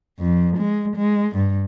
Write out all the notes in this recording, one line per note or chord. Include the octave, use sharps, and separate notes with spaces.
F2
G#3
G#3
G2